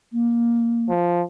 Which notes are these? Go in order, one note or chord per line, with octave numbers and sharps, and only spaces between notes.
A#3
F3